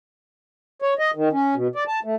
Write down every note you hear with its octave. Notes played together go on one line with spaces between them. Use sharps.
C#5
D#5
D#3
C#4
B2
D5
A5
A3